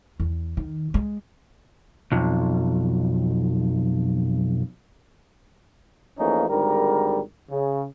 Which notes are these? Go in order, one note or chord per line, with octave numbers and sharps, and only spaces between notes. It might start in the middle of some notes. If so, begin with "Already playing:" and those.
E2
D#3
G#3
B1 F2
E2 F3 A3 A#3 C#4 D#4
G#1 G#2 D3 G3 A#4
C#3